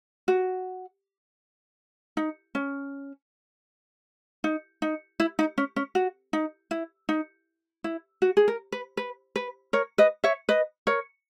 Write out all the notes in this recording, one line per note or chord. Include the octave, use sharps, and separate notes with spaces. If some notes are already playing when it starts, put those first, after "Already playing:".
F#4
D#4
C#4
D#4
D#4
E4
D#4
C#4
C#4
F#4
D#4
E4
D#4
E4
F#4
G#4
A#4
B4
B4
B4
A#4 C#5
B4 D#5
C#5 E5
B4 D#5
A#4 C#5